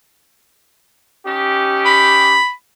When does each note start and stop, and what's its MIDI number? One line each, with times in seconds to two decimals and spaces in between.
1.26 2.38 61
1.26 2.38 63
1.26 2.38 67
1.86 2.52 83